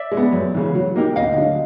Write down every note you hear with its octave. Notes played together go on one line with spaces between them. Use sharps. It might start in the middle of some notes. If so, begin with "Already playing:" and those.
Already playing: D5 E5
G#3
B3
F#2
C#3 E3
F#3
A#3 D#4 G4 A#4
D2 D#5 F5
D3 F#3